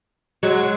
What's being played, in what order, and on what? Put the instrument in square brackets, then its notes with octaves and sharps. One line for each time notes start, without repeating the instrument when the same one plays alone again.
[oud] F#3 G#3